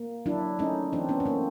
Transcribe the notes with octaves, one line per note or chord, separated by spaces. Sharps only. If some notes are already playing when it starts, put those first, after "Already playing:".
Already playing: A#3
F#3 D4 E4
A3 C#4 D#4
E3 C4 D4
B3 C#4
C#4
A3 A#3 C4